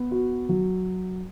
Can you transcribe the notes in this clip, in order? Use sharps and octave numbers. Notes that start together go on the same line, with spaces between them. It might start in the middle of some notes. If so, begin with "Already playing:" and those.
Already playing: B3
F#4
F#3